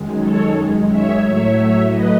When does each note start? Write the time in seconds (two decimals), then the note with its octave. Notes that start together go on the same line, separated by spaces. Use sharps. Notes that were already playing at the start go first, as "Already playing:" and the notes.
Already playing: F#2 D#3 G#3
0.20 A4 C#5
0.88 C#5 E5
1.21 A2 F#3 A3 C#5 E5
1.88 B4 D#5